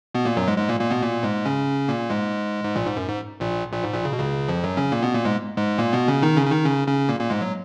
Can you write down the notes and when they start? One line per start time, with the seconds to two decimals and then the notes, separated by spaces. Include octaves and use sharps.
0.15 B2 B3
0.25 A#2 A#3
0.36 F#2 F#3
0.47 G#2 G#3
0.58 G#2 G#3
0.69 A#2 A#3
0.80 A#2 A#3
0.90 B2 B3
1.02 A#2 A#3
1.23 G#2 G#3
1.46 C#3 C#4
1.88 A#2 A#3
2.10 G#2 G#3
2.64 G#2
2.76 A#1 A#2
2.86 G#2
2.96 F#2
3.08 G#2
3.40 A#1 A#2
3.72 A#1 A#2
3.84 G#2
3.94 A#1 A#2
4.05 C#3
4.13 B2
4.19 C#2 C#3
4.48 F2 F3
4.64 F#2 F#3
4.77 C#3 C#4
4.92 A#2 A#3
5.03 B2 B3
5.14 A#2 A#3
5.25 G#2 G#3
5.57 G#2 G#3
5.78 A#2 A#3
5.93 B2 B3
6.08 C#3 C#4
6.22 D#3 D#4
6.36 C#3 C#4
6.46 C#4
6.51 D#3 D#4
6.65 C#3 C#4
6.88 C#3 C#4
7.09 A#2 A#3
7.20 A#2 A#3
7.30 G#2 G#3
7.41 F#3